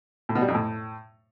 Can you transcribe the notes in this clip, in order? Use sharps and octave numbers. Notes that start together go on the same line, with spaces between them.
A2
B2
G3
F2
A2